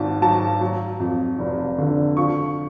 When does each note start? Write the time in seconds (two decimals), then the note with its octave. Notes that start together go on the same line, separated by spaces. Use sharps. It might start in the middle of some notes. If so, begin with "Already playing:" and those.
Already playing: G#1 G#2 A5
0.21 F#3 A5
0.61 F#3
1.00 F2
1.39 F1
1.78 D3
2.17 F3 C#6